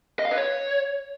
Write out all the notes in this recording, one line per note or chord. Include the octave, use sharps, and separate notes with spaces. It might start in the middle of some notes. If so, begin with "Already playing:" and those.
D#5
F5
B4
C#5